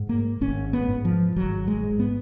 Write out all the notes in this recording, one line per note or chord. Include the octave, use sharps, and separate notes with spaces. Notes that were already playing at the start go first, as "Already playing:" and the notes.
Already playing: G#2
A#3
G#1 C#4
B3
G#2
F3
G#1 F#3
G#3
G#2
B3